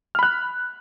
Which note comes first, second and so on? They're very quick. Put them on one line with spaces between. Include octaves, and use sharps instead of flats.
F6 B5 F#6